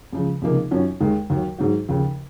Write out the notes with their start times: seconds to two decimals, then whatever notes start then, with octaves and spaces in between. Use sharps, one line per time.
0.13 C#2 C#3 F3
0.42 C#2 C3 F3 A#3 D#4
0.71 F#2 D#3 F#3 C#4 F4
1.00 D#2 D#3 G#3
1.30 D#2 D#3 F#3
1.58 G#2 D#3 F#3
1.89 D#2 C#3 F3